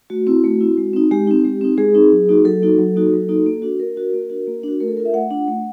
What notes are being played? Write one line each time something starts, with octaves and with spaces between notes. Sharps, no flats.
A3 F#4
C4 E4
A3
C4 E4
G#3
C4 D#4
G#3 G4
C4 D#4
G#3
C4 D#4
G#3 G#4
C4 D#4
F#3
A#3 D#4 F#4
F#3 A4
A#3 D#4 F#4
F#3
A#3 D#4 F#4
F#3
A#3 D#4 F#4
A#3
D4 F#4
A#3 A#4
D4 F#4
A#3
D4 F#4
A#3
D4 F#4
A3 A#4
A4
D4 F4 A#4
E5
A3 F#5
D4 F4
A3